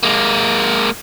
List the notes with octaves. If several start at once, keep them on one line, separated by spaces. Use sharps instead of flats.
G#3 A#3